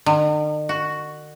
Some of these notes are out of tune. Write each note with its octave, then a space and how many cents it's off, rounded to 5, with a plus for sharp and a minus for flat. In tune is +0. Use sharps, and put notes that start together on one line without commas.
D#3 -45
F#4 +5